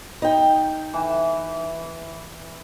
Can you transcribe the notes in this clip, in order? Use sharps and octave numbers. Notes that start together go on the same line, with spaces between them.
D#4 G5
E3